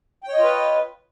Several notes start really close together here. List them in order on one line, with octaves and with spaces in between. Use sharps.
G5 C#5 D#5 F4 B4